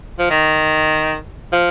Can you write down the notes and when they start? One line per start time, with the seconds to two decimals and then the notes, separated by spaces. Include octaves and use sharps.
0.19 F3
0.30 D#3
1.53 F3